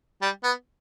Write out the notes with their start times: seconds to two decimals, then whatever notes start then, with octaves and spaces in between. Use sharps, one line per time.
0.22 G3
0.44 B3